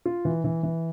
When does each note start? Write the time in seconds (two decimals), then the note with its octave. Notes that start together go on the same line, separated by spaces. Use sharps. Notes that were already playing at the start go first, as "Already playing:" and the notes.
0.06 F4
0.25 E3
0.44 E3
0.63 E3